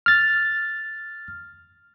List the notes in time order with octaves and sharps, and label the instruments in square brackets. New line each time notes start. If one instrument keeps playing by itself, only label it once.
[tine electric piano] F6 A6